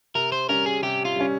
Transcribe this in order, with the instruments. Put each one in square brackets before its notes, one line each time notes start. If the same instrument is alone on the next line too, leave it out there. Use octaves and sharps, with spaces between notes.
[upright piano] C3 [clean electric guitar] A#4
[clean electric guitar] C5
[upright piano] G3 C#4 [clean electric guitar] A#4
[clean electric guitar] G#4
[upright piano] C3 [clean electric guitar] G4
[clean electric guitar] F4
[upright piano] G3 C#4